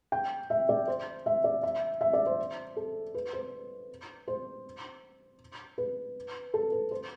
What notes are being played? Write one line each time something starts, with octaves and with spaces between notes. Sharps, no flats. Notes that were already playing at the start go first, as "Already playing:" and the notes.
G5
E5
D5
C5
E5
D5
E5
E5
D5
C5
A4
B4
C5
C5
B4
A4
B4
C5